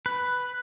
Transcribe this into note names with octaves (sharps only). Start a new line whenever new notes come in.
B4